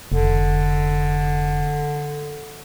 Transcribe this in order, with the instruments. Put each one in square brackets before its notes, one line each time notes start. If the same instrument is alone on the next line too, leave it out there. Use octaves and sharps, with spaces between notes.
[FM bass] F1 [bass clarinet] D3